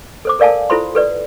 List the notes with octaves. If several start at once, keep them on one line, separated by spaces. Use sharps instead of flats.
A4 C5 D6
A4 A#4 D5 F5 G#5 A5
E4 F4 A4 C5 B5 C6
A4 B4 D5